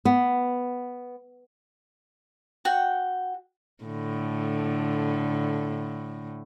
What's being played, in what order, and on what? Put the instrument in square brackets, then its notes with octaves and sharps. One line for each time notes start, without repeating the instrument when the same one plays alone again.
[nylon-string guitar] B3
[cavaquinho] F#4 F#5 G5
[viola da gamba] A2 D3